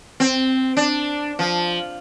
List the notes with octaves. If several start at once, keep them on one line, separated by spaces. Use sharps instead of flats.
C4
D4
F3